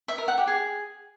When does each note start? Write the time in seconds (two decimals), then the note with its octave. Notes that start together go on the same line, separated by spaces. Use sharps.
0.08 E5
0.18 A#4
0.28 F#5
0.38 G4
0.47 G#4